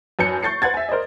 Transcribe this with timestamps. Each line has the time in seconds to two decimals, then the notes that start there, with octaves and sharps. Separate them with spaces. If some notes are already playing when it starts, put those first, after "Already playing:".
0.19 F#2 B4 G#5 A5 G6 C#7
0.43 C#6 G6 A6 C7 C#7
0.62 B4 F#5 C6 G#6 A6
0.74 E5 G#5
0.89 A#4 C5 D5 D#5